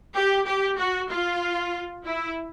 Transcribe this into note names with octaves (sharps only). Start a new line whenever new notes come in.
G4
G4
F#4
F4
E4